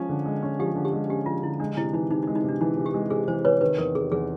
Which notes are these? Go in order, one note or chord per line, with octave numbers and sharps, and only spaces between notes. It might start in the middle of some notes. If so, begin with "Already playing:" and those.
Already playing: F3 G#3 C#4
D3
G#3
C#4
F3 G4
D3
G4
G#3
C#4 G4
F3 F4
D3 E4
G#3 D4
C3 E4
E3 D#4
C3 D#4
D#4
G#3
D#4
C3 D4
E3 D#4
C3
G4
G#3
C3 G#4
E3 C5
C3 B4 C#5
D#3 B4
E2 A#4
C3 G#4
E2 G#4